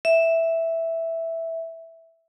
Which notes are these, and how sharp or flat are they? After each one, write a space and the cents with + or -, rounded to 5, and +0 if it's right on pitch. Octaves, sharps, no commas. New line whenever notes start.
E5 +0